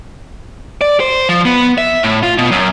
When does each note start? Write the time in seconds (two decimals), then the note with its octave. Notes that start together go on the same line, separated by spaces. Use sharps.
0.81 D5
1.00 C5
1.29 F3
1.45 B3
1.78 E5
2.03 A2
2.23 F4
2.38 B2
2.51 F#2